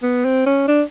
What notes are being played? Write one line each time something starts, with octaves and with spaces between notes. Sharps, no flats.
B3
C4
C#4
D4